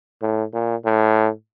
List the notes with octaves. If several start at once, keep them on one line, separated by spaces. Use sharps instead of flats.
A2
A#2
A2